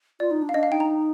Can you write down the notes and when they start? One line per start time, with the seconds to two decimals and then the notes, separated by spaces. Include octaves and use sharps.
0.20 F4 D5
0.31 D#4
0.42 D4
0.49 F5
0.54 D4 D#5
0.63 F5
0.71 D#4 G5
0.80 A#5